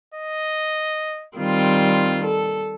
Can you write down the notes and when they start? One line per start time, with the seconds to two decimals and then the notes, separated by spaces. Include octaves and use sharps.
0.14 D#5
1.38 D#3 G3 C4 F4
2.24 A4